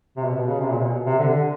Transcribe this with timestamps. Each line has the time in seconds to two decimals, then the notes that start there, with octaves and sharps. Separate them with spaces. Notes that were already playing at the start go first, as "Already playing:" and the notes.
0.17 C3
0.25 B2
0.35 B2
0.48 C#3
0.60 C3
0.71 A#2
0.82 B2
1.06 C3
1.18 D3
1.29 D3